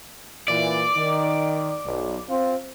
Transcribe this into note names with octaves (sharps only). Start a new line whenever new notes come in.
A#2 E3 D5
D#3
B1
C4 F4